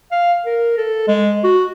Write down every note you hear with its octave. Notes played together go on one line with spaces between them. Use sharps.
F5
A#4
A4
G#3
F#4